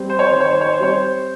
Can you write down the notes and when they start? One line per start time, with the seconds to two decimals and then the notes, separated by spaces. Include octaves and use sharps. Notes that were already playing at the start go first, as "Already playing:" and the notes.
Already playing: G3 C4
0.10 C5
0.19 C#5
0.30 D#3 C5
0.40 C#5
0.51 C5
0.61 C#5
0.73 C5
0.80 G3 C4 C#5
0.93 C5